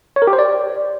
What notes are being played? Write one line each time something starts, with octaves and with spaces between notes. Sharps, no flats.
C#5
A#4
G4
C5
D5